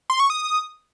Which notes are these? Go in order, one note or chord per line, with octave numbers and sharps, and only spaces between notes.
C6
C#6
D#6